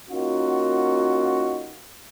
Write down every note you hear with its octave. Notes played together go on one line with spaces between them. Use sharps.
A#3 C#4 D#4 F4 F#4